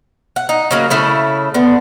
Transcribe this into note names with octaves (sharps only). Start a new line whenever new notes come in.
F#5
D#4
C#3 F#3 A#3
C#3 A3 E4
D3 B3